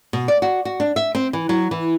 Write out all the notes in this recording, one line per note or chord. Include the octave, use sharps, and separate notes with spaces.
B2
D5
F#4
F#4
D4
E5
C4
E3
F#3
E3